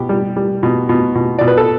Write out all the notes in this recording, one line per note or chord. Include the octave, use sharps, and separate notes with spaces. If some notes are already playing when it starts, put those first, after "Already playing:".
Already playing: B2 G4
G3
G3
B2
B2
B2
B2 D5
B4
A4